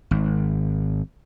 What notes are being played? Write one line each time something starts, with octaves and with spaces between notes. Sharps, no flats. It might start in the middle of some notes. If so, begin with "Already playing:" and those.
G#1